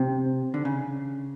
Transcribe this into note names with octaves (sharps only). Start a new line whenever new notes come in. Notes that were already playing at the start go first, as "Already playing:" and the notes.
Already playing: C3
D3
C#3